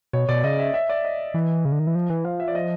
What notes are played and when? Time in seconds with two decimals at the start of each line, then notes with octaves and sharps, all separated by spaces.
0.13 B2 C#5
0.29 B2 D5
0.44 C#3 D#5
0.59 E5
0.74 E5
0.89 D5
1.05 D#5
1.34 E3
1.65 C#3
1.72 D3
1.79 D#3
1.87 E3
1.95 F3
2.10 E3
2.25 F3 F5
2.40 E5
2.48 D5
2.55 D#5